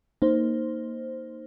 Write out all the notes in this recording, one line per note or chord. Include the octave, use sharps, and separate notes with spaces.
A#3 D#4 C5